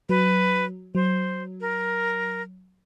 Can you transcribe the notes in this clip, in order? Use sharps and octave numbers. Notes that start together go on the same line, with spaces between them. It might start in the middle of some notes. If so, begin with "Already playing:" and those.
F#3 B4
F#3 C5
A#4